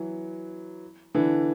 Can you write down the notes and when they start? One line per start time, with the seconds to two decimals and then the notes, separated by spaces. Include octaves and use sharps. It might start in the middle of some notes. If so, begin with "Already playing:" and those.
Already playing: E3 F#3
1.15 D3 E3